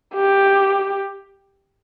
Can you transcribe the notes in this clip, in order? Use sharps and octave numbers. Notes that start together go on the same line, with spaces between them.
G4